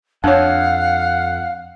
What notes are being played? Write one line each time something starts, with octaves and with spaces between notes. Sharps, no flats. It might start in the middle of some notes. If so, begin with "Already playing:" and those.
F2 D4 C#5 F5 F#5